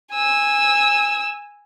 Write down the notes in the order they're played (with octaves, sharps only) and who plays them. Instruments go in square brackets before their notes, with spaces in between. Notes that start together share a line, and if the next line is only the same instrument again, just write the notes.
[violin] G#5 E6